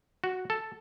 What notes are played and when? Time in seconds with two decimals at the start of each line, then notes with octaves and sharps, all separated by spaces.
0.24 F#4
0.50 A4